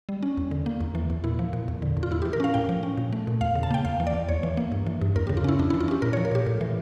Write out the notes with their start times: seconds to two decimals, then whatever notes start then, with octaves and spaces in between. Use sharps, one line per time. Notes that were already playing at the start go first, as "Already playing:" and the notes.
0.09 G3
0.23 C#4
0.37 E2
0.51 D3
0.66 A#3
0.81 E2
0.95 E3
1.10 E2
1.24 A#2 E4
1.39 F3
1.53 A#2
1.68 E2
1.82 D3
1.97 E2
2.03 F4
2.11 A2 E4
2.22 G4
2.25 E3
2.33 A#4
2.40 C#4 F5
2.54 A2 G5
2.69 F3
2.83 C#4
2.97 A#2
3.13 A3
3.27 A#2
3.41 E2 F5
3.55 C#3
3.63 A5
3.71 A#3 G5
3.85 E2 F5
4.00 E3
4.07 D5
4.14 E2
4.29 E2 C#5
4.43 E3
4.57 A#3
4.72 G2
4.87 E3
5.01 G2
5.16 E2 A#4
5.27 C#3 G4
5.37 F4
5.44 C#4 E4
5.59 F2 D4
5.70 E4
5.74 E3
5.81 F4
5.88 C#4 G4
6.02 A#2 A#4
6.13 C#5
6.17 F3
6.25 A#4
6.32 A#2 G4
6.46 A2
6.61 E3